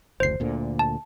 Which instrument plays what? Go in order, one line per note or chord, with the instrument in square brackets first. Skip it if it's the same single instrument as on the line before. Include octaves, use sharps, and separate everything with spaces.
[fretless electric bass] F#1 D2 [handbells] C5 C7
[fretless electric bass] D2 A#2 D3
[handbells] A5